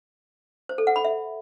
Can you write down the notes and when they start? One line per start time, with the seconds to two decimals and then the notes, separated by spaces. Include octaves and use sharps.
0.69 C5
0.78 A4
0.87 F#5
0.96 B5
1.05 E5